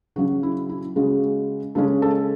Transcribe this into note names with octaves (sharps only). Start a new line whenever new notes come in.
C#3 F#3 C#4 F#4
E4
E4
C#3 G#3 C#4 F#4
C#3 G#3 C#4 A4
A4